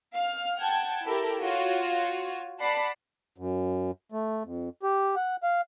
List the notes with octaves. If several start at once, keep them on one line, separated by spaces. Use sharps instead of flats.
F5 F6
F#5 G5 A5 G#6
E4 G4 A4 A#4
F4 F#4 C#5
D5 F#5 A5 B5 C7
F#2
A3
F2
G4
F#5
F5